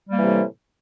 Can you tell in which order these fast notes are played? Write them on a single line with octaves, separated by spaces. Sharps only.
G3 A#3 E3 C3 A2